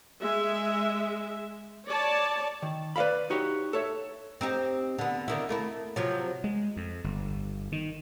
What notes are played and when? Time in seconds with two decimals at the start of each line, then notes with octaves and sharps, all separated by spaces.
0.20 G#3 E5
1.88 C#5 D5 A5
2.62 D#3
2.96 B4 D5 E5 F5 B5
3.30 D#4 F#4 G4 C#5
3.73 A4 C#5 E5
4.41 C4 D#4 G4
4.99 D3 B3
5.28 D3 D#3 E4
5.49 A3 A#3 E4
5.96 C3 F3 F#3
6.44 G#3
6.77 F2
7.04 G1
7.72 D#3